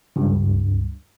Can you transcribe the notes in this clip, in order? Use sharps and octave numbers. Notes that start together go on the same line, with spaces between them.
C#2 G2